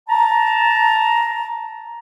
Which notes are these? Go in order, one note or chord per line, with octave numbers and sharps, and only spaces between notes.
A5 A#5